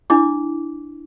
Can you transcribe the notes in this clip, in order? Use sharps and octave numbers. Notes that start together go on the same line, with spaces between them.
D4 E4 D6